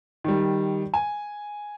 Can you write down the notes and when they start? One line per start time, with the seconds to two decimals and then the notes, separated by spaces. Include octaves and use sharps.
0.24 D#3 G3
0.94 G#5